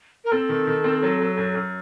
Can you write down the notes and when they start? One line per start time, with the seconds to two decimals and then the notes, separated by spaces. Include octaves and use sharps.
0.25 A#4
0.31 C4 A4
0.49 D#3
0.67 D#3
0.84 C4
1.03 F#3
1.20 F#3
1.37 F#2
1.55 F#2